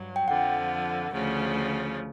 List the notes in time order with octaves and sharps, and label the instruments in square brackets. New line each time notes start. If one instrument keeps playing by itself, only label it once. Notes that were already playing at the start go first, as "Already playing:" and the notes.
Already playing: [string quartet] G2 F#3
[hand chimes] G5
[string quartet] F2 D3 F3 [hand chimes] F#5
[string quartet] D2 C#3 F3